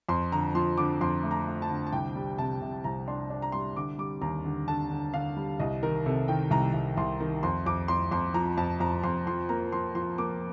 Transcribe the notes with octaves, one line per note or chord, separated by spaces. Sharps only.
F2 C6
D3 A#5
F3 C6
D3 D6
F2 C6
A3
A#5
A3
A5
D3
A5
C2 G5
G3
C3 A5
C3
C2 A#5
D4 C6
D4
A#5
G3 C6
D3 D6
G3 D6
D#2 A#5
D3
D3 A5
D3
D3 F5
G3
C2 D#5
D#3 A#4
C3 A4
D#3 G5
C2 A#5
C2
C2 C6
D#3
F2 C6
F2 D6
F2 C6
F2 C6
F3 A#5
F2 A5
F2 A#5
F2 C6
F3 C6
A#3 A#5
F3 C6
F3 C6
A#3 D6